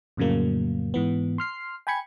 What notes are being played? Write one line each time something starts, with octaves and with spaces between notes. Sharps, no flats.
F2 A2 C#3 F#3 A#3
G#2 E3 B3
C6 F6 C7
G5 G#5 B5 G#6 C#7